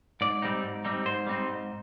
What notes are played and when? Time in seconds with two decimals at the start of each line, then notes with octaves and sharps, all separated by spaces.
0.21 G#2 D5
0.42 G3 C4 D#4
0.64 G#2
0.85 G3 C4 D#4
1.05 G#2 C5
1.27 G3 C4 D#4
1.49 G#2